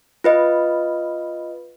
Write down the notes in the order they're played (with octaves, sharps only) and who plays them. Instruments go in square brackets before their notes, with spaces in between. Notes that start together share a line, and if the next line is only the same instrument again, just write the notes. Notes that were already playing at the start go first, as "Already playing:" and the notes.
[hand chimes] F4 B4 D#5